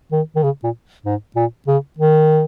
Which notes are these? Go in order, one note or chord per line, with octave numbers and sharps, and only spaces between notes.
D#3
D#3
C#3
A#2
G#2
A#2
C#3
D#3